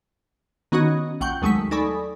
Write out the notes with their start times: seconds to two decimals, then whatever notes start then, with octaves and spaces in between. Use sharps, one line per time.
0.72 D#3 B3 C#4 D#4 F#4 D#5
1.21 A#1 F#5 G5 C#6 G6
1.42 D#2 F#3 G#3 A3 C#6 B6
1.71 D#4 A4 D5 G#5 B5 C#6